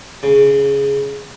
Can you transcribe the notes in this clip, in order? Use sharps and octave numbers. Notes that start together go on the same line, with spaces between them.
C#3